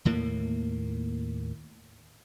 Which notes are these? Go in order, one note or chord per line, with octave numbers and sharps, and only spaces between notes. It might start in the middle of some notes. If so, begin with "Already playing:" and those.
D#2 A2 A#3